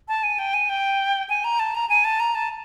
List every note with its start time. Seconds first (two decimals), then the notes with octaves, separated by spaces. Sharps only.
0.08 A5
0.23 G#5
0.39 G5
0.54 G#5
0.69 G5
1.29 G#5
1.44 A#5
1.59 A5
1.75 A#5
1.89 G#5
2.04 A5
2.20 A#5
2.35 A5